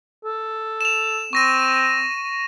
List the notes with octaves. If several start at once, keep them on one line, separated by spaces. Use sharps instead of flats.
A4
E7 F7
C4 C#6 A#6 D#7